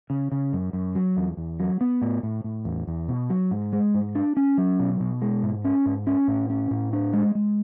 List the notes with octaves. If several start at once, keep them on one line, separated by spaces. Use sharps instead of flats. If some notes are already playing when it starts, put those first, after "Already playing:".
C#3
C#3
F#2
F#2
F#3
E2
E2
F#3
B3
A2
A2
A2
E2
E2
B2
F#3
G#2
G#3
G#2
D4
C#4
F#3
B2
B2
G#3
G#2
C#4
G#2
C#4
A2
C#4
A2
D4
G#3
G#3